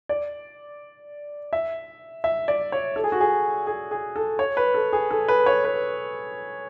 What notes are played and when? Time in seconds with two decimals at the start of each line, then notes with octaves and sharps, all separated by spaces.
0.09 D5
1.53 E5
2.24 E5
2.48 D5
2.72 C#5
2.96 A4
3.04 G#4
3.12 F#4
3.20 G#4
3.67 G#4
3.91 G#4
4.16 A4
4.39 C#5
4.57 B4
4.74 A4
4.93 G#4
5.11 A4
5.28 B4
5.46 C#5
5.64 B4